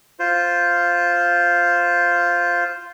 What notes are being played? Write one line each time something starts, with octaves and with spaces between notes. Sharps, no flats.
F4 C5